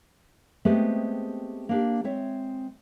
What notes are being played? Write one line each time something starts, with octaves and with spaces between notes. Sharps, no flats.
G#3 A3 B3 C4 G4 G#4
A#3 D4 G4
G#3 C4 C#5 E5